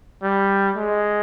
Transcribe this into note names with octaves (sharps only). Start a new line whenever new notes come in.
G3
G#3